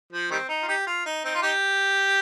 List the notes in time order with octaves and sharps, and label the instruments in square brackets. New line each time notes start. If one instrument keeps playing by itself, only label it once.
[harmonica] F3
D#3 G3 C4
D#4
F4
D#4 G4
F4
D#4
C4 D#4
F4
D#4 G4